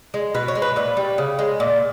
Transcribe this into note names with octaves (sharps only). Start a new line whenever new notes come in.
G#3
B2 B4
C#5
G#3
B4
A#2 B4
G3
C#3
G#3
A#2